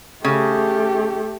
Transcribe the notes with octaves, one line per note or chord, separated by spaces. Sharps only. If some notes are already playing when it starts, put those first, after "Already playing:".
C#3 A3 G4